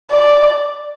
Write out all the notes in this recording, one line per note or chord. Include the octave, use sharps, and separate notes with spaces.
D5